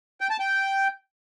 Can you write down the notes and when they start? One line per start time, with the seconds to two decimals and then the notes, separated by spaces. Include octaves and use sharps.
0.21 G5
0.30 A5
0.39 G5